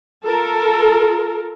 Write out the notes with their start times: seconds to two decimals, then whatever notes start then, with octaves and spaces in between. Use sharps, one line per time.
0.25 F4 A4 A#4